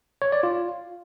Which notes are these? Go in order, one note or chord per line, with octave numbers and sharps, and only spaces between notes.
C#5
D5
F4